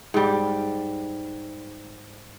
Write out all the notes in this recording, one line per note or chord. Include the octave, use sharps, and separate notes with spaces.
G#2 G3